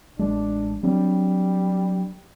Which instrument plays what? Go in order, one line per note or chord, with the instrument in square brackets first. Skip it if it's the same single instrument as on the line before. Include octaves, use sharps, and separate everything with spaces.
[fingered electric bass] A1 G#3 [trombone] D4
[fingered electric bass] F#3 C4 D4 [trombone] G3